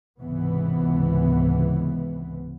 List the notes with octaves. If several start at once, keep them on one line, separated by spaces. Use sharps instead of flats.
G#1 C#2 C3 E3 B3